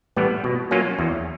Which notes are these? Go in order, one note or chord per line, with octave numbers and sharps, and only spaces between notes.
A2 E3 G3 B3
B2
F#3 A#3 C#4 F4
E2